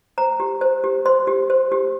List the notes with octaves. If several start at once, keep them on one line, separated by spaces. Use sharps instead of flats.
C5 A#5
G4
C5
G4
C5 C6
G4
C5
G4